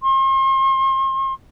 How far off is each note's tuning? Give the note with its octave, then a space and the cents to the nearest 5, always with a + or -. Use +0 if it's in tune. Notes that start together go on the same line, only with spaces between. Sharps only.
C6 +40